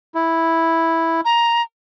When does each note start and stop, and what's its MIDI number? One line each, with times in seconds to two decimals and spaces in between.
0.15 1.21 64
1.25 1.62 82